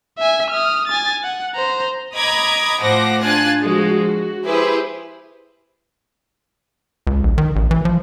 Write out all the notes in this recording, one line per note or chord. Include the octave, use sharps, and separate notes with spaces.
E5 G#5
D#6 F6
G#5 A6
F#5
C5 A#5
D#5 A#5 B5 D6 D#6 G#6
A2 F3 C5 F#5 D6 A#6
D4 F4 G#5 F#6 A6
F3 G#3 F#4
F#4
E4 G4 G#4 B4 C5
C#2
A#1
D#3
A1
E3
F3